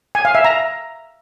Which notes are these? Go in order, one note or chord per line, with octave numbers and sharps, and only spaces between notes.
G#5
F5
E5
A#5